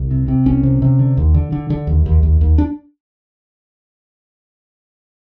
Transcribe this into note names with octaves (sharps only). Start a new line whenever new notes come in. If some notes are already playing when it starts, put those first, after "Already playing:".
Already playing: C2
C3
C3
C2 C#4
C3
C3
D3
D#2
D3
D3
D3
D#2
D#2
D#2
D#2
D4